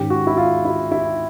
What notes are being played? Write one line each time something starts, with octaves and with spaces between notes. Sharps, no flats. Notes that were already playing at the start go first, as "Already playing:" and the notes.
Already playing: G#2 D#3 G#3 C#4 G4
F#4
E4
F4
E4
E4